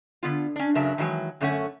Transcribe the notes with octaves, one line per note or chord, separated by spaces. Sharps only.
D3 B3 F4
C#4 D4
F#2 C#3 F#3 A#4 E5 A5
D#3 E3 F#3 G#3
F#2 D3 A3 C#4 C#5 F#5